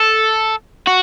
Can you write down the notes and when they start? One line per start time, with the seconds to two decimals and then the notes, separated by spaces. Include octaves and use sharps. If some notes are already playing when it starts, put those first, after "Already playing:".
Already playing: A4
0.87 F#4